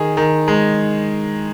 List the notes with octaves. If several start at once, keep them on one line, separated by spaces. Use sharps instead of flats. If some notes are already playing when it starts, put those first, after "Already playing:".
Already playing: D#3 G#4
D#3
G#3